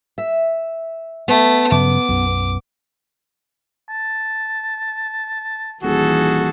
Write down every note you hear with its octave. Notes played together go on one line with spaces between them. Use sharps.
E5
A3 B3
G2 C#3 F#3 D6
B1 F#2
A5
D#1 E3 F#4 G#4 A4